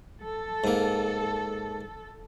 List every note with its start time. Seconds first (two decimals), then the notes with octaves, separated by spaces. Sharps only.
0.22 A4
0.64 G#2 A#3